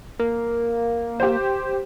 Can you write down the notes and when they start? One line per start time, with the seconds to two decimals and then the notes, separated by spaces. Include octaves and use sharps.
0.20 A#3
1.20 G4 C5